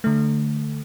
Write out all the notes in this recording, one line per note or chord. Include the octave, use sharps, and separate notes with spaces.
D3 A3